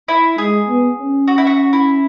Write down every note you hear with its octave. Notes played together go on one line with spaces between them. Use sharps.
E4
G#3 G#4
B3
C#4
F#4
E4
F#4
E4